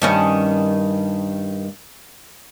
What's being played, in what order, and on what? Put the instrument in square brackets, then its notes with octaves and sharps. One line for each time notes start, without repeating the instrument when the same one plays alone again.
[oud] G2 D#3 C#4